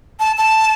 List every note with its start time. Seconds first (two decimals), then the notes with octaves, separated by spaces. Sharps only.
0.20 A5
0.37 A5